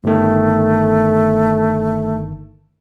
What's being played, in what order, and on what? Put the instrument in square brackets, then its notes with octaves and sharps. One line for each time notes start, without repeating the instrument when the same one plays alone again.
[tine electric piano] G1 D#3 [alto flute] A3